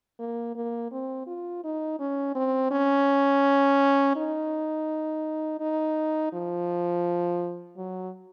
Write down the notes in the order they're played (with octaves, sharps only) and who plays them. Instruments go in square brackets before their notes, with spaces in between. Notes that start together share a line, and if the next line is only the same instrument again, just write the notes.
[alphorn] A#3
A#3
C4
F4
D#4
C#4
C4
C#4
D#4
D#4
F3
F#3